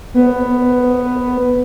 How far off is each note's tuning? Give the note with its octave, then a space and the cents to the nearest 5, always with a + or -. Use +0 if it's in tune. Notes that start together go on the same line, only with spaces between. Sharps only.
B3 +10